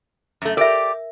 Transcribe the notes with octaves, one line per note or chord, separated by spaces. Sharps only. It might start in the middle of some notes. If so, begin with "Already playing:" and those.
F#2 A3
G4 A#4 D5 E5